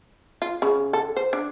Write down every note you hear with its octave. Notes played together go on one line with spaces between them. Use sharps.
F4
C#3
A4
C5
D4